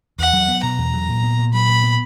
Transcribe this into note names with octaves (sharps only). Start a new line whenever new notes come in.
E2 F#5
F#3
B3
B2 A#5
E2
F#3
A#2
B3
A#2
F#3 B5
A#2
B3